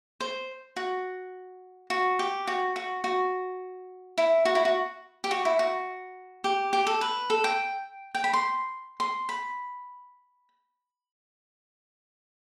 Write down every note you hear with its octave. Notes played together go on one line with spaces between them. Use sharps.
C5
F#4
F#4
G4
F#4
F#4
F#4
E4
F#4
E4
F#4
G4
F#4
E4
F#4
G4
G4
A4
B4
A4
G5
G5
B5
C6
C6
B5